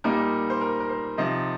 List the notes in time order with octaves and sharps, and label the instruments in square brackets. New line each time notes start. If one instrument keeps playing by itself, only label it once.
[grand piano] A#2 G3 A#3 D#4 A#4
C5
A#4
A#4
C5
C3 F3 C4 D#4 D#5